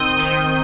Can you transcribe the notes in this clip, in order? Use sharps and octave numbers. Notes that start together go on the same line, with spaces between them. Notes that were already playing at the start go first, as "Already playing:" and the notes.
Already playing: D#3 C4 D#6 G6
D#3